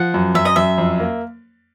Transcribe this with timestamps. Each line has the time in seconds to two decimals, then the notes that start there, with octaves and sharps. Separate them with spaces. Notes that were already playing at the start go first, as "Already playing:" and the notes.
Already playing: F3 F#5
0.14 F#2
0.35 F#2 E5
0.45 D#5
0.56 F#2 E5
0.78 F2
1.00 A#3